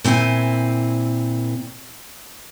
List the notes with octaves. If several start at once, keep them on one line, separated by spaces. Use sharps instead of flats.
A#2 C4 E4 D5 G#5